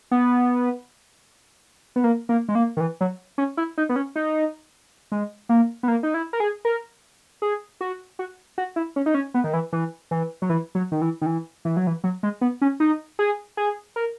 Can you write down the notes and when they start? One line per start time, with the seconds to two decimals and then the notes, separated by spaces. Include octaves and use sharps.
0.11 B3
1.96 B3
2.04 A#3
2.29 A#3
2.49 G#3
2.55 A#3
2.77 D#3
2.80 E3
3.01 F#3
3.38 C#4
3.57 E4
3.78 D#4
3.89 B3
3.96 C#4
4.16 D#4
5.12 G#3
5.49 A#3
5.83 B3
5.88 A#3
6.03 D#4
6.14 E4
6.33 A#4
6.40 G#4
6.65 A#4
7.42 G#4
7.81 F#4
8.19 F#4
8.58 F#4
8.76 E4
8.96 C#4
9.06 D#4
9.14 C#4
9.34 B3
9.44 D#3
9.53 E3
9.73 E3
10.11 E3
10.42 F#3
10.50 E3
10.75 F#3
10.92 D#3
11.01 E3
11.21 D#3
11.26 E3
11.65 E3
11.77 F#3
11.87 E3
12.04 F#3
12.23 G#3
12.41 B3
12.62 C#4
12.80 D#4
13.19 G#4
13.57 G#4
13.96 A#4